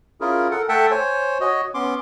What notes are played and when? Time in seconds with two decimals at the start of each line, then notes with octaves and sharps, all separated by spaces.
0.21 C#4 E4 F4 G#4 A#4
0.51 A4 A#4 F#5
0.69 A3 A4 E5 F#5 G5 A5
0.91 C5 C#5 G#5
1.41 F#4 C#5 D#5
1.74 B3 C#4 C6 D6